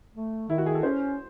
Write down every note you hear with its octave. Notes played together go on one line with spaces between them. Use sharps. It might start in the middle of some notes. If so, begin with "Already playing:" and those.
A3
D#3 E4
F#4
G#4
A4
C#4 C5